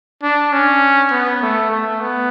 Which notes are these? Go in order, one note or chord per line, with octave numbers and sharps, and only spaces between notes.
D4
C#4
B3
A3
A3
B3